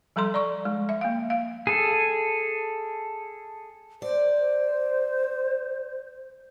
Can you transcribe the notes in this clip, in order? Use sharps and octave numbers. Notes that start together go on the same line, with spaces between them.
F3 G3 A4 A#5 C6
D5 A#5 C#6
G#3
E5
A#3 F5
F5
G#4 A4
C5 D5